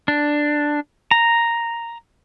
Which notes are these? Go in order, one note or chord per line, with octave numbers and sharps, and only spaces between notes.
D4
A#5